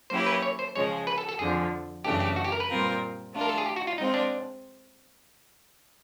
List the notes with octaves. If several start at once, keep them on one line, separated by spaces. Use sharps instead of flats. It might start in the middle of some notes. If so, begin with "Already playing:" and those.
F#3 A#3 C#4 E4 G4 C5
B4
C#5
C5
C#3 F3 G#3 C#5
B4
A4
A4
F2 D3 F3 G#4
F#2 C#3 E3 A3 D4 G4
G4
F#4
G4
A#4
B4
A#2 G3 C4 F4 A#4
A3 D4 F4
A#4
A4
G#4
G4
F#4
F4
G#3 C4 D#4 F4
D4